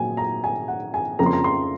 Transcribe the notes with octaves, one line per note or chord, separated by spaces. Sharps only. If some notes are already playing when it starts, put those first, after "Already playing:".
Already playing: A#2 F#3 G#5
A#5
G#5
F#5
G#5
F2 C#3 F3 A#3 C#4 A#5
C6
A#5
C6